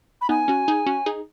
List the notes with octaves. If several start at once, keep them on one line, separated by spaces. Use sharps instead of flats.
B5
B3 D#4 G#5
C#4 F#4
D#4 G#4
C#4 F#4
D#4 G#4